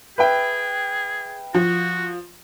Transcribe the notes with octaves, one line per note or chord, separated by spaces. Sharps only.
G#4 B4 E5 G5
F3 F#4